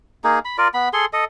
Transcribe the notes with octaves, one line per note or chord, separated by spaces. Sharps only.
A#3 D#4 G#4
B5
F4 A#4 D5
B3 B5
G#4 A4 C6
A4 D#5